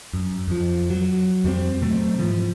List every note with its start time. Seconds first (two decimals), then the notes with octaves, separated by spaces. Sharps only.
0.13 F#2
0.48 F2 F3
0.90 F#3
1.44 F2 G3 G#3 C4
1.82 B2 F#3 A3 C4
2.19 G#2 E3 F3